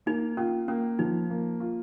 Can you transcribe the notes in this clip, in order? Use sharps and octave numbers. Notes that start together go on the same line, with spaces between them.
A#3 D#4
C#4 F4
A#3 C#4
F3 D#4
A#3
F4